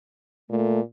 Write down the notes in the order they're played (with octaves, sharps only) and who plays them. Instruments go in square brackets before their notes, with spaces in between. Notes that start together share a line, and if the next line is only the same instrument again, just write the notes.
[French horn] A#2 [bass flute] A3